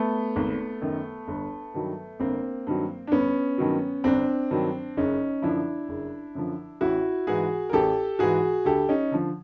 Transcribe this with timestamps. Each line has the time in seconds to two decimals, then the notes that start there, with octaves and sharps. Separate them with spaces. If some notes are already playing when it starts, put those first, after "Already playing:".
Already playing: A3 B3
0.36 G#1
0.82 F#2 D#3
1.28 G1
1.74 G2 D#3 F#3
2.20 G1 A#3 C4
2.67 G2 D#3 F#3
3.07 D4
3.12 G1 B3 C#4
3.58 G2 D#3 F#3
4.04 G1 C4 D4
4.51 G2 D#3 F#3
4.97 F#1 C#4 D#4
5.42 F#2 D3 F3 D4 E4
5.89 F#1
6.35 F#2 D3 F3
6.81 A1 E4 F#4
7.27 G#2 E3 F#4 G#4
7.70 A#4
7.73 A1 G4 A4
8.19 G#2 E3 F#4 G#4
8.65 D2 G4 A4
8.89 C#4 D#4
9.11 D3 F3